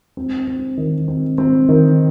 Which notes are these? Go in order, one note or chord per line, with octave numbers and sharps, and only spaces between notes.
C4
C4
D#3
C4
C4
D#3